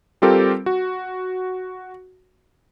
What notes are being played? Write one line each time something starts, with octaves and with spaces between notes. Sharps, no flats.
G3 C4 F4 G4 A4 A#4
F#4